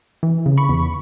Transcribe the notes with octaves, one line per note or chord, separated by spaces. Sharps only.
E3
C#3
B5 C#6
E2